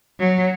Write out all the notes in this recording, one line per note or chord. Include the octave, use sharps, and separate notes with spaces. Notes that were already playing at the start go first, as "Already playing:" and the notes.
F#3